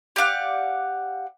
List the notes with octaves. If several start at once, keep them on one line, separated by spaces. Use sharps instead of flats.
G4 D5 F5 F#5